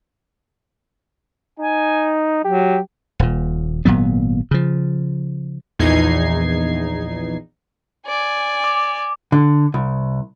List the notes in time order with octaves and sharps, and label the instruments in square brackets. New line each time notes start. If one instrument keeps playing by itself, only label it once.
[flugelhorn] D#4 [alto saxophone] G#5
[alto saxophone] F#3 [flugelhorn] G4
[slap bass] D#1 A#2
G#1 A#2 F#3 B3
C#3 F3
[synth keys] A#1 E2 D#4 G#6 C7
[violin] D5 G#5
[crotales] D6
[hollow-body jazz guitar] D3
C2